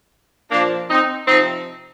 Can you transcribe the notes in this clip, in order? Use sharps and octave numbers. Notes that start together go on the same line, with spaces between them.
A#2 F3 A#3 D4
C4 D#4
C3 F3 C4 D#4